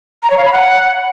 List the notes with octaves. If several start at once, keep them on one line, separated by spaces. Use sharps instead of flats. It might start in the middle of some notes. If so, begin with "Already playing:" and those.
A#5
C#5
F5
B5
F#5